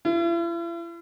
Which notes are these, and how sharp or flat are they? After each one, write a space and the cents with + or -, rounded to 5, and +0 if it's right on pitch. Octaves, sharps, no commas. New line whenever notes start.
E4 +45